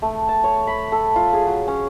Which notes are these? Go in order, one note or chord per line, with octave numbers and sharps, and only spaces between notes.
A3
A5
C#5
B5
A4
F4
G#4
F#3
C#4